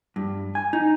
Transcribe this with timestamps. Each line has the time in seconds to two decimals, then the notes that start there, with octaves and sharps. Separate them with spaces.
0.16 G2
0.55 G#5
0.73 D#4